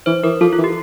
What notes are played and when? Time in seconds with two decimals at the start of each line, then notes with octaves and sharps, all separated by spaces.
0.06 E3 C5
0.24 E3 A#4
0.41 F3 A4
0.53 F4
0.58 E3
0.64 G4